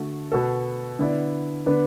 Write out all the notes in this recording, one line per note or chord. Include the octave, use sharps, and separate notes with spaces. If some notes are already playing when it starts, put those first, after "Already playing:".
Already playing: D3 A3 F#4
B2 B3 F#4 A4
D3 B3 E4 D5
D3 B3 D4 B4